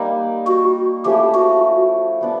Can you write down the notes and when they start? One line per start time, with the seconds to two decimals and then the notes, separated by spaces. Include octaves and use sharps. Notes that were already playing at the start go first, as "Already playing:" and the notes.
Already playing: G3 A#3 D#4
0.47 F#4
1.05 F3 A3 C#4 E4 G4
1.34 F#4
2.21 G3 B3 D4